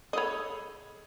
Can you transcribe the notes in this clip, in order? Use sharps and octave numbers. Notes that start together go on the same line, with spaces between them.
G#4 A4 C#5 D#5 B5